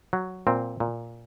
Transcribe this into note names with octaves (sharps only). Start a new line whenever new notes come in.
F#3
A#2 C4
A#2